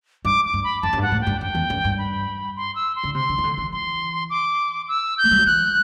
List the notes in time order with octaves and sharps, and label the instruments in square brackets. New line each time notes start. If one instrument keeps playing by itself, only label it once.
[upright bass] G2 [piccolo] D6
[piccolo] D6
[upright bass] G2
[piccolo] B5
[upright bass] F#2 [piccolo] A5
[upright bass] F#2
G2
[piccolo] F#5
[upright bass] A2
[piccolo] G5
[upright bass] G2
[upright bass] F#2 [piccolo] G5
[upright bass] E2
F#2
G2
[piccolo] B5
C6
E6
C6
[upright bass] D3
[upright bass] C3 [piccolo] C6
[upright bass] D3
E3
D3
E3
[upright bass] E3 [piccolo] C6
[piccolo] D6
E6
G6
[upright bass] A3
G3
F#3
[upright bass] E3 [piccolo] F#6